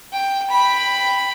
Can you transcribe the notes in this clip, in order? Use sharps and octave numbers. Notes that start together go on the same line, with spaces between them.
G5
G5 B5